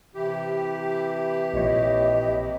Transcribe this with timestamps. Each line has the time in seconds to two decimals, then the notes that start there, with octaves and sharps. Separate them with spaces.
0.15 C3 E3 E4 G4
1.53 A#1 A#2 C#5 D#5